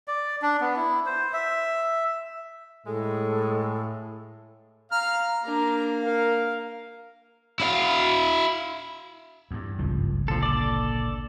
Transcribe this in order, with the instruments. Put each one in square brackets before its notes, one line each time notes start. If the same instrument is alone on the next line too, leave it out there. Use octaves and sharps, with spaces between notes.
[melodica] D5
D4
B3
E4
C5
E5
[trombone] A2 [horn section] G#3 [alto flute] A4
[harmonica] F5 F6 [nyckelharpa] A#5
[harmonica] A#3 [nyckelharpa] D4 A#5
[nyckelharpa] A#4 F5
[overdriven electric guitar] E4 F5
[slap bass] E2 G2
[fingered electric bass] G#1 C#2 C#3 [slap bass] G2 F3
[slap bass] A#2 D3 [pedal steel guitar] F3 A4
[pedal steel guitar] A4 D5